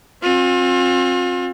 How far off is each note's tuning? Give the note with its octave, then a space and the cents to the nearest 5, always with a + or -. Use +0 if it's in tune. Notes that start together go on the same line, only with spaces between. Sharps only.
C4 +35 F4 +40